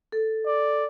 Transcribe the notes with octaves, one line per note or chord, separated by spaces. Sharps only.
A4
D5